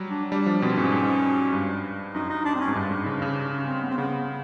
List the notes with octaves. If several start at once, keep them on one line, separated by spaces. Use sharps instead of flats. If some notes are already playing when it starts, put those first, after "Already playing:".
Already playing: F#3 G3
D4
G3 D4
F3 D4
B2 C4
G#2 C#4
G#2
G2
F#2 D#4
D#4
D4
C4
C#4
G#2
G2
G#2
C#3 D4
C#3
C#4
C4
B3
C4
C#3 B3
B3